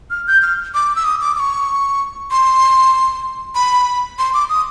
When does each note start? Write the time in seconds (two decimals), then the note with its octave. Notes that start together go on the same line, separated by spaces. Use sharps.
0.11 F6
0.27 G6
0.42 F6
0.74 D6
0.96 E6
1.04 D#6
1.21 D6
1.36 D6
1.40 C#6
2.31 C6
3.55 B5
4.19 C6
4.34 D6
4.49 D#6